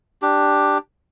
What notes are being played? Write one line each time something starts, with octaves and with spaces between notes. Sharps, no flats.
D4 G4